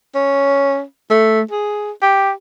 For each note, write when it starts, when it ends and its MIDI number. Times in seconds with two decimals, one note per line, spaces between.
0.15 0.83 61
1.10 1.41 57
1.51 1.91 68
2.02 2.32 67